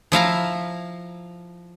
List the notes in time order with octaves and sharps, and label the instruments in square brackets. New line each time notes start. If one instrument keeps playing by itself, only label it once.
[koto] F3 E4 F5 A#5